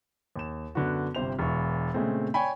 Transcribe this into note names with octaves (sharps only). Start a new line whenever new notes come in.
D#2 E7
F#2 D3 B3 F#4
G1 C3 C5 F7
E1 E3 C#6
A#2 C#3 G#3 A3 C4
C#5 D5 G5 G#5 B5